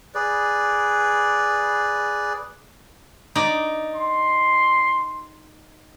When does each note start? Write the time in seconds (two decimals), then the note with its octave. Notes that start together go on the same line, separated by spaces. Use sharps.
0.15 G#4 B4 D5
3.35 D#4 D5
3.95 C6